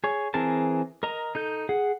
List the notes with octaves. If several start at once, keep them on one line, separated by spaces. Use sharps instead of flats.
G#4 C#5
E3 C4 G#4 A#4 A5
A#4 D#5 A#5
D#4 A4 G6
G#4 F#5